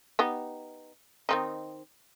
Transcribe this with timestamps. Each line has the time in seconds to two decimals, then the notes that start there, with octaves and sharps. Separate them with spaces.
0.19 B3 D#4 G4
1.29 D#3 C4 D#4